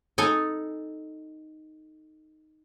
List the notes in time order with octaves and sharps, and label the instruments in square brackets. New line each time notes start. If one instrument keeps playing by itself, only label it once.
[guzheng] D#4 A4 D#5 G#5